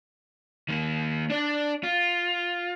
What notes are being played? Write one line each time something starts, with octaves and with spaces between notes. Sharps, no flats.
D#3 A#3
D4 D5
F4